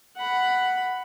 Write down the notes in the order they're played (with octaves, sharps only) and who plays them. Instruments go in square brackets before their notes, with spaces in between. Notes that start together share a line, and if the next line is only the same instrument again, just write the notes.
[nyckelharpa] F#5 B5